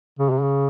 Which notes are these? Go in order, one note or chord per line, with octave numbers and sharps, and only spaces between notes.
C#3
C3
C#3